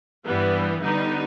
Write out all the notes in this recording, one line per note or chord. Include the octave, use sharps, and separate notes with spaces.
G2 E3 G3 B3
D3 G3 B3 D#4